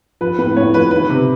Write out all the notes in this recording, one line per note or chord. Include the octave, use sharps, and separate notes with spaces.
F3 B4
A2 B4
A2 C#5
F3 B4
D#3 B4
C3